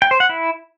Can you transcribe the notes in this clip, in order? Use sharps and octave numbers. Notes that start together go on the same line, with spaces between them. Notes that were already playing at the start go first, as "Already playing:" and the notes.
G5
C5
F#5
E4